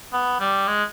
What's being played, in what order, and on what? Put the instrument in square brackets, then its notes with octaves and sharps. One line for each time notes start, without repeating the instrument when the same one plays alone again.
[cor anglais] B3
G3
G#3